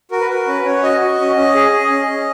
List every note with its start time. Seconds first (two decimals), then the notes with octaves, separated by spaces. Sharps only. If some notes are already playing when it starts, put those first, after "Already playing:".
0.11 F#4 A#4
0.20 B4
0.29 F#4 A#4
0.47 C#4 B4
0.65 C#4 C#5
0.83 F#4 D#5
1.01 F#4
1.18 C#4
1.36 C#4
1.55 G#4
1.73 G#4
1.90 C#4
2.07 C#4